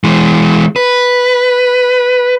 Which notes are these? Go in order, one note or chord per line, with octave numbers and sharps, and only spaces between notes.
E3 G#3
B4